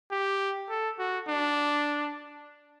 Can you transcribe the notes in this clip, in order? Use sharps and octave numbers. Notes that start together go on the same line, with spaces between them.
G4
A4
F#4
D4